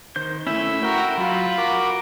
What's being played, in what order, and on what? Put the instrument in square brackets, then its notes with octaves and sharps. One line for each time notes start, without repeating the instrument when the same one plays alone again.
[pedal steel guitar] D#3 C5 G6
[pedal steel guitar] A3 C#4 [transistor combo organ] E4 B5 E6
[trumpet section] F#4 A#4 [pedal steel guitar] G5
[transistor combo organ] F#3 [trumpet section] F4 B5
[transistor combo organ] F#4 A#4 D6